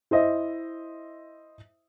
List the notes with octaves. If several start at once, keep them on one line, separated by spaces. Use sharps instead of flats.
E4 C5 D#5 E5